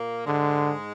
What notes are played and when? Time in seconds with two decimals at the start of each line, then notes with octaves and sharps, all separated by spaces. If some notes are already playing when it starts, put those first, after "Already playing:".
Already playing: A#2 A#3
0.26 G#2 D3 G#3